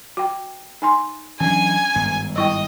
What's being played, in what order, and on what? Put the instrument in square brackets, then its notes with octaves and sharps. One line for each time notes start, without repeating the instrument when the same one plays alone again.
[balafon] F#4 G5
D#4 G#5 C6
[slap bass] E3 F#3 D4 [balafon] C#4 [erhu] G#5
[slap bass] G#1 G2 B3
[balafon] G3 E4 G5 [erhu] D#5